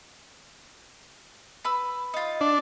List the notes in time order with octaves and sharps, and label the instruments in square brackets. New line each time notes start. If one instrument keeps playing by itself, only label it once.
[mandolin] B4 B5 E6
D#4 F4
[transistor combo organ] D4